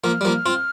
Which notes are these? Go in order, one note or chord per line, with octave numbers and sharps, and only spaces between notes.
F3 A#3 F6
G3
F3 A#3
C4 F4